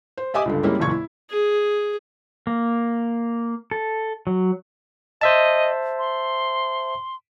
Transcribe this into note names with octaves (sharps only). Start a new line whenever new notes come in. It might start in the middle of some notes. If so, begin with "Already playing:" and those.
C5
G4 D#5 E5 G#5 D6 D#6
C#2 G2 D3
G3 G#3 A#3 C#4 E4
F#1 E2 A#2 C#6 G#6
E4
G#4
A#3
A4
F#3
C5 D#5 E5 A5
C6